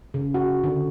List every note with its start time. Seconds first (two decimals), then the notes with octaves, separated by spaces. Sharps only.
0.14 C#3
0.34 F#4
0.64 D3